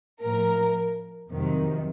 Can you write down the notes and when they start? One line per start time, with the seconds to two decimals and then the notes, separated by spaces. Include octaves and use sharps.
0.21 A2 F3 A#4
1.30 F2 C3 D#3 F#3